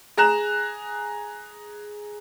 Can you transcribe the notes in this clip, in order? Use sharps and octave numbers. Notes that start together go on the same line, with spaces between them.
G#4 A#5 F#6 E7